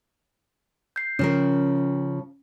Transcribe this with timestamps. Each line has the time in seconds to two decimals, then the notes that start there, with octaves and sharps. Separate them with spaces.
0.96 G6 C7
1.19 C#3 F3 C#4 A#4